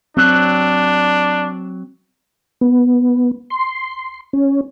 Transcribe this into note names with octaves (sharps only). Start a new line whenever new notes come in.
F#3 C4 D4
B3
C6
C#4